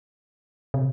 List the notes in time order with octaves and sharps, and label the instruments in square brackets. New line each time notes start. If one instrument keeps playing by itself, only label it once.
[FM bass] C3